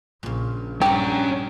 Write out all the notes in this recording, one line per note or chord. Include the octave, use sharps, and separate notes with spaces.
A#1 A#2 C#3
G2 G3 C#4 G4 F#5 A#5